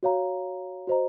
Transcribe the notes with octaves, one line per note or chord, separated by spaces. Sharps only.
F#4 C#5 F5 A#5
F#4 C5 D#5 A#5